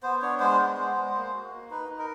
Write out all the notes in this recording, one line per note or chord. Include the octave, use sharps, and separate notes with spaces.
B3 C5
D4 C#5
G#3 C5
B3
G#3
G#3
A#3
F#4
A#3
D#4 B4
D#4
A#4